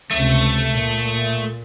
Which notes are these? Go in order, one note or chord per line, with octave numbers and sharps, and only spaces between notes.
C#2 C3 A3
A#2